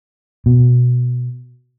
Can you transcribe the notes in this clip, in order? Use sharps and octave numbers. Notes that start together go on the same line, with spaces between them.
B2